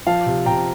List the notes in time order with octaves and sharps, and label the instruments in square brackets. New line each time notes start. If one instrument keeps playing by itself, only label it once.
[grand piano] F3 [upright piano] F5 A5
[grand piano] C3
[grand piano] C3 [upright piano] G5 A#5